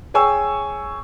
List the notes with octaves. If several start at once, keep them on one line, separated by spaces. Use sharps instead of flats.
G#4 C#5 G5 G#5 C#6 E6